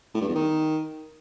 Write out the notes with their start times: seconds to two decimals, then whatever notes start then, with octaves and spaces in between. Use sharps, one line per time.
0.14 A2
0.21 G2
0.28 E2
0.35 D#3